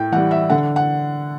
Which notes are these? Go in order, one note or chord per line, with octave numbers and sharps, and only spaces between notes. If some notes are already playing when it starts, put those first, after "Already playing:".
Already playing: A2 G5
E3 G3 F#5
E5
D3 F#5
F#5